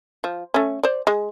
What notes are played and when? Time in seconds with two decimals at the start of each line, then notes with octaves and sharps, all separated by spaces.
0.24 F3
0.54 A3 C#4
0.83 C5 D5
1.07 G#3